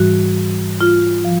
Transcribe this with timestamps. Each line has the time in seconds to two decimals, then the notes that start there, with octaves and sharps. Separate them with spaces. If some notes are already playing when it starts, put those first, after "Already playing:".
Already playing: G#2 E3 G3 F#4
0.81 F4
1.25 F3